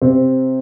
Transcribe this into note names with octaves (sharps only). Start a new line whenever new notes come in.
C3 C4